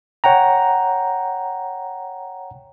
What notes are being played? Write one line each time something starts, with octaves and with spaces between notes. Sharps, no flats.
C#5 F#5 G5 A#5